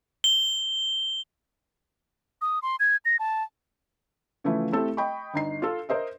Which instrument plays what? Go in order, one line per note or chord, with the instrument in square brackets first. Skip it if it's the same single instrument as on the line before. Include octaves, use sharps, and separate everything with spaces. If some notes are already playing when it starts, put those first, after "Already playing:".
[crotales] G7
[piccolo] D#6
C6
G#6
A#6
A5
[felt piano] C#3 E3 F3 A3 E4
A3 C4 E4 G4 A4
D#5 G5 B5 C#6
G1 D#4 C7
F4 A4
A#4 C5 D#5 E5